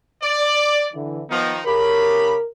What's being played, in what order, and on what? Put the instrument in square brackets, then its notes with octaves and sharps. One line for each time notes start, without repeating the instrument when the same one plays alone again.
[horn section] D5
[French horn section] D3 E3
[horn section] D#3 F3 D#4 [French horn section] B3
[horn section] C#3 G4 B5 [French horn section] A#4